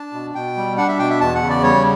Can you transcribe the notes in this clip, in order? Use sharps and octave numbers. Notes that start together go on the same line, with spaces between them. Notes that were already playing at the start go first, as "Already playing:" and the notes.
Already playing: D4 A5
B2
B2 G5
G3
D4 F#5
E5
B2 G5
E5
E2 A5
F#5
C#3
D5
G3 C#5